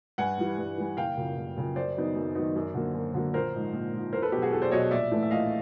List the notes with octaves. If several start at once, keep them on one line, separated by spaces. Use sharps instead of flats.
G2 F#5 G#5
E3 G3
G2
E3 G3
F#1 F5 G5
F#2 C#3 F3
F#1
F#2 C#3 F3
F#2 C5 D5
D#3 F#3 B3 D#4
F#2
D#3 F#3 B3 D#4
F#2
D3 F#3 A#3
F#2
D3 F#3 A#3
A#1 A#4 C5
G#2 F3
A#1
G#2 F3
E2 A#4 C5
A4 B4
B2 F#3 G4
F#4 G#4
E2 G4 A4
C5 D5
B2 F#3 C#5 D#5
A#1 D5 E5
A2 E3 A3
E5
A#1 D#5 F5